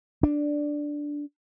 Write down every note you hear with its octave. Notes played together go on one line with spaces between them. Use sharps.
D4